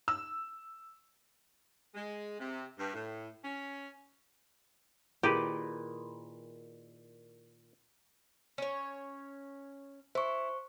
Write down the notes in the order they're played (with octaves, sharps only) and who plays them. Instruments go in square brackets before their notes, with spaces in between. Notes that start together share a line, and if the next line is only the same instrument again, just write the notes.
[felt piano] E6
[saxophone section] G#3
C3
G2
A2
C#4
[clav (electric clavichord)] A#2 D#3 B4 [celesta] E4 G#4 [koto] G4
[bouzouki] C#4 C#5
[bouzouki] E4 [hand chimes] C5 C#6